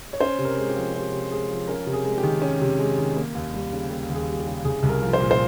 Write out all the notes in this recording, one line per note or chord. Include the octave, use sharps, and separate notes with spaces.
C#5
C#4 C5
C3
A#4
G#3
G4
F3
C#4 G4
C3
G#3 G#4
F3
C#4 A#4
C3
G#4
G#3
G4
D#3
C#4
C3
G#3
D#3
A#3
D#2
G3
C#3
A#3 G4
D#2
G#4
G3
G4
C#3
C2 G#4
C2
A#4
F3
C5
A#2
C5